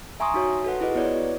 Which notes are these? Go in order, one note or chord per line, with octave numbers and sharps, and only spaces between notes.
E5 G#5 A#5 C6 C#6 D#6
D#4 F#4 C#5 E5
F#4 A4 B4 F#5
E4 F4 G#4 B4 D#5
B3 E4 B4 C#5 D5